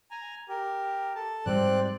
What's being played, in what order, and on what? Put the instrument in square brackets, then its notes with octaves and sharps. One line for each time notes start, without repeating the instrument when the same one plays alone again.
[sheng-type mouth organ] G#5 A#5
G4 A#4
A4 A5
[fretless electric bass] G#2 F3 G3 [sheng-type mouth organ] C4 D5 F#6